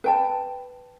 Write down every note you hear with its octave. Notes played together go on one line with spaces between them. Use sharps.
B4 G5 A5